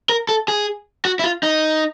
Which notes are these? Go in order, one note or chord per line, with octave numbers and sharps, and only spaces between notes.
A#4
A4
G#4
F#4
E4
F4
D#4